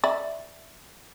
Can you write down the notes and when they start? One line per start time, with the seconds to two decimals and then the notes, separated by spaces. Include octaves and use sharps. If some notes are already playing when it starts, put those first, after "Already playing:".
0.04 D5 E5